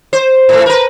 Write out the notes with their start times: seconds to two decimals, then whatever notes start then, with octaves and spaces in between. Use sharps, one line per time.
0.13 C5
0.49 A2 A3
0.66 A#4 B4